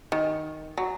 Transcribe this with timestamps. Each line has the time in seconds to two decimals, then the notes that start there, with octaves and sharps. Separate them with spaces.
0.12 D#3
0.78 F#3